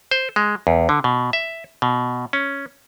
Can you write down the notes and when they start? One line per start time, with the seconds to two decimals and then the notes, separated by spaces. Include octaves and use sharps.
0.11 C5
0.36 G#3
0.67 E2
0.89 D3
1.04 B2
1.33 E5
1.82 B2
2.33 C#4